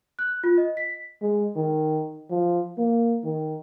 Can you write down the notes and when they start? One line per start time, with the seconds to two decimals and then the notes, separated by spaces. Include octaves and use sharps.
0.19 F#6
0.44 F4
0.58 D#5
0.77 B6
1.22 G#3
1.56 D#3
2.30 F3
2.78 A#3
3.24 D#3